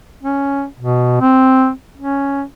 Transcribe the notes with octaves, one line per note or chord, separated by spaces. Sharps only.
C#4
B2
C4
C#4